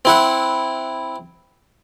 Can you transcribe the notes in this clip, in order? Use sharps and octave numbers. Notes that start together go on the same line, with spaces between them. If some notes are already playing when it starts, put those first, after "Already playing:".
C4 E4 F#5